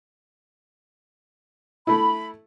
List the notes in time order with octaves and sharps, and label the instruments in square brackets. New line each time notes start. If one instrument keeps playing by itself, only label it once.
[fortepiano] A3 E4 [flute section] B5